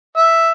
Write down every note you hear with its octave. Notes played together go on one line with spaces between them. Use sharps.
E5